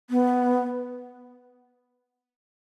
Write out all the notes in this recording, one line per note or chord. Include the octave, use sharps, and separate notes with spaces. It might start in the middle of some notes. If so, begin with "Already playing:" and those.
B3